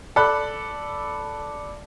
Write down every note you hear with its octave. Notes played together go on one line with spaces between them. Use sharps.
A4 D5 B5 F#6